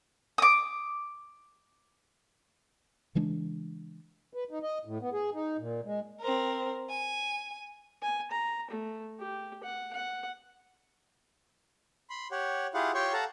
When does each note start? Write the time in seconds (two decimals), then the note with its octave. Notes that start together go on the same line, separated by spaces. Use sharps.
0.38 D6 D#6
3.15 C#3 E3 G#3 D4
4.34 B4
4.51 D#4
4.63 D#5
4.85 A2
5.01 B3
5.13 G#4
5.34 D#4
5.58 A#2
5.85 G#3
6.20 C4 A#4
6.90 G#5
8.02 G#5
8.32 A#5
8.71 A3
9.20 G4
9.64 F#5
9.93 F#5
12.10 B5 C6
12.31 G4 C#5 F#5
12.74 E4 F4 G4 G#4 F5 F#5
12.95 F4 G4 C#5 G5 C6 C#6
13.13 A4 F5 F#5 A5 A#5